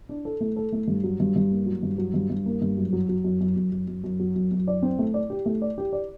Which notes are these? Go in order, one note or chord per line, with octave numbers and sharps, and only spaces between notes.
D4
A4
A3
A4
A3
G2
F#3
G2
G2
A#3
F#3
G2
F#3
G2
G2
A#3
G2
F#2
F#3
F#3
F#2
F#2
F#2
F#2
F#2
F#2
F#3
F#2
F#2
D5
C4
A3
D5
G4
A3
D5
G4
D5